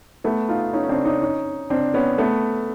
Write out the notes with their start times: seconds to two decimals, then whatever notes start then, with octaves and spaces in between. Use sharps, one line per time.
0.24 A3 B3
0.49 D#4 F4
0.73 C#4 D#4
0.84 C#4
0.89 C4 D4
1.05 C#4 D#4
1.22 C#4 D#4
1.70 C4 D4
1.94 B3 C#4
2.18 A3 B3